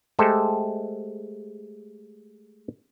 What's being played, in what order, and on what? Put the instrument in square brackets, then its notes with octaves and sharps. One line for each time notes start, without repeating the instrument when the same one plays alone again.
[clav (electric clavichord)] G#3 A3 G4 A4 C5